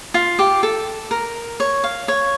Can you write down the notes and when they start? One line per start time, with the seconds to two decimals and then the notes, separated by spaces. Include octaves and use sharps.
0.14 F4
0.39 G4
0.63 A4
1.11 A#4
1.60 C#5
1.84 F5
2.08 C#5